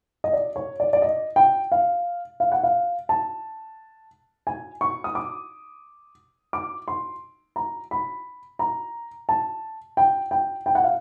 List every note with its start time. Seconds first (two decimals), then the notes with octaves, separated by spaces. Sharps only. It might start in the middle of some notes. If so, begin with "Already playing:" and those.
0.24 D#5
0.33 D5
0.56 C#5
0.80 D5
0.93 D5
1.02 D#5
1.36 G5
1.72 F5
2.40 F5
2.52 F#5
2.63 F5
3.09 A5
4.47 G#5
4.81 C#6
5.04 D#6
5.15 D6
6.53 D6
6.88 C6
7.56 A#5
7.91 B5
8.59 A#5
9.29 A5
9.97 G5
10.31 G5
10.66 G5
10.75 F#5
10.84 F5